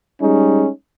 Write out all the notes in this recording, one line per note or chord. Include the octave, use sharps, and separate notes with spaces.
G3 G#3 C#4 D#4